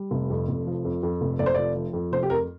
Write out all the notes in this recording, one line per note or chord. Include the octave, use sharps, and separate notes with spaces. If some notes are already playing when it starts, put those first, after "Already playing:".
Already playing: G3
F1
F2
F1
F3
F2
F2
F1
F1 D5
C5
F3 D5
F3
F2
F1 C5
G4
F2 A#4